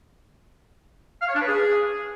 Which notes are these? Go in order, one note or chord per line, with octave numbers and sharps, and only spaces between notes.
F5
C#5
D4
B4
G#4